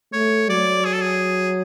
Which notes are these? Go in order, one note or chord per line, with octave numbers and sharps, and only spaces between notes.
A3 C#5
F#3 D5
G#4
A4
G#4